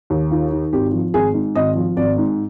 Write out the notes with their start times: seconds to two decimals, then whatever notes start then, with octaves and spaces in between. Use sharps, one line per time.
0.10 D#2
0.31 D#3 F4
0.51 D#3
0.73 G#1 G4
0.93 F3
1.14 G#1 G#4
1.34 G#2
1.55 G#1 D#5
1.76 F3
1.96 G#1 D5
2.18 G#2